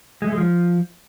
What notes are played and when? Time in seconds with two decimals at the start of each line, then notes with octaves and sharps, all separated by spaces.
0.22 G#3
0.27 A3
0.32 G#3
0.38 F3